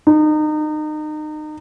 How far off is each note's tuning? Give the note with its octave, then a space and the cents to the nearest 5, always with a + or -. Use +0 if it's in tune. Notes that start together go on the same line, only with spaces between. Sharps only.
D#4 -30